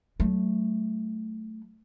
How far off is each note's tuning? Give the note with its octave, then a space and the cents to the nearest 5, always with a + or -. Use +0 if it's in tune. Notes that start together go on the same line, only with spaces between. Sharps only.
F#3 +30 A3 +0